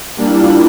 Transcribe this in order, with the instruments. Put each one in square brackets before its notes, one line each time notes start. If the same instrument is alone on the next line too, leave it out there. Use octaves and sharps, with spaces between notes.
[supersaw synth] G3 A#3 D4
[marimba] E4
F4
E4